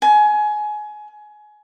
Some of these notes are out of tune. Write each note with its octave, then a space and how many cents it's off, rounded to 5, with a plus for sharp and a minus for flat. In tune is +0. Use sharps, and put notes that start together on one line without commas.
G#5 +25